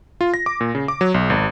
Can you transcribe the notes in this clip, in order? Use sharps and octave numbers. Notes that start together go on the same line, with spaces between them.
F4
A#6
D6
A#2
C#3
D6
F#3
B1
G#1